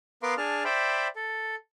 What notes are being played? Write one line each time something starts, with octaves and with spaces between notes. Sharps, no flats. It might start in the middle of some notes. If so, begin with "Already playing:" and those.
B3 A#4 B4 F5 C6 D6
D4 G#4 A5 F6
C5 D5 E5 G5 B5
A4